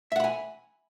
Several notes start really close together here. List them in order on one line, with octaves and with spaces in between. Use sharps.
E5 F#5 B5 G#5